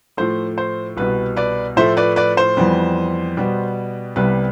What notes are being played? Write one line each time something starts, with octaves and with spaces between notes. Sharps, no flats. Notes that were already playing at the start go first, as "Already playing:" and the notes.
A2 F3 A3 C5
C5
C2 B2 B3 B4
B4 D5
A2 F3 A3 C5 E5
B4 D5
B4 D5
C5
F2 E3 G3 B3
B2 G3 B3
C2 C3 G3 B3 B4